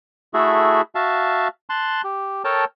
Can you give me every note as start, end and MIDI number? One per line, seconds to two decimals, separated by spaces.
0.34 0.82 57
0.34 0.82 64
0.34 0.82 66
0.34 0.82 68
0.34 0.82 69
0.34 0.82 76
0.95 1.48 66
0.95 1.48 76
0.95 1.48 77
0.95 1.48 81
1.70 2.01 81
1.70 2.01 84
1.70 2.01 90
2.04 2.43 67
2.44 2.65 69
2.44 2.65 70
2.44 2.65 73
2.44 2.65 79
2.44 2.65 81